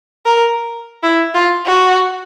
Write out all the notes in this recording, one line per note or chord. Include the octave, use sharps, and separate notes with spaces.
A#4
E4
F4
F#4